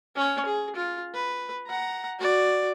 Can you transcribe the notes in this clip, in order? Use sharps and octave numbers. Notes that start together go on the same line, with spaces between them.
C#4 C#5
G#4
F4
B4
F#5 A#5
F#4 D5